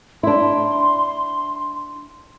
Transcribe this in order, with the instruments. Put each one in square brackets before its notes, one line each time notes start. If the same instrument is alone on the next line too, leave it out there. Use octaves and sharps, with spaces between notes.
[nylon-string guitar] D4 E4 [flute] C6